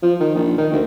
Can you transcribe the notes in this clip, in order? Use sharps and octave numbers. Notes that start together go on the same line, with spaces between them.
F3
D#3
A#1
D#3
D2